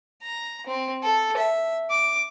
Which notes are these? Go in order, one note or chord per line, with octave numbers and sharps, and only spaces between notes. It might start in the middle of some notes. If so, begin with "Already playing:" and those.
A#5
C4
A4
E5
D6